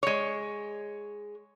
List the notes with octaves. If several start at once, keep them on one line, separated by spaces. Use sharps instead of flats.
G#3 C#5